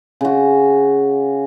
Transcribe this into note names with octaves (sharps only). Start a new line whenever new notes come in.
C#3 F#4